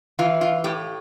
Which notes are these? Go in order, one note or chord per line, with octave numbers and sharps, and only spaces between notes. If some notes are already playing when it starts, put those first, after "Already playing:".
E3 F4
F4
A2 G4